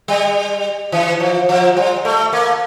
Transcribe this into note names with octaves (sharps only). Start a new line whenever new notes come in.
G3
E3
F3
F3
G3
A3
A#3